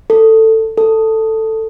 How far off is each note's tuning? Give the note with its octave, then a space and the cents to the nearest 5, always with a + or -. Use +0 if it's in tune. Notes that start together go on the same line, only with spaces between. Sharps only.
A4 +15
A4 +10